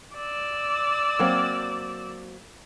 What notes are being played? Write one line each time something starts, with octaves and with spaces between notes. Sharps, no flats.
D5 E6
F#3 A#3 C4